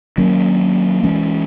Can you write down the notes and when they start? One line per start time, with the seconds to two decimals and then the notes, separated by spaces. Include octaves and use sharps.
0.18 D#3 F#3 A#3 C#4
1.03 E3 G#3 C#4